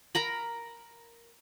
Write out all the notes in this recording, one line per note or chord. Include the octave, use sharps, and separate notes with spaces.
A#4 A#5 B5